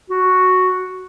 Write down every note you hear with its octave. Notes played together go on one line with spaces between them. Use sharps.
F#4